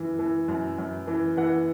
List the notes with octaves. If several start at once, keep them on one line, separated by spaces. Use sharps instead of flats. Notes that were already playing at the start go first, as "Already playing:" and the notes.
Already playing: F#2 E3
E3
F#2
F#2
E3
E3 F#5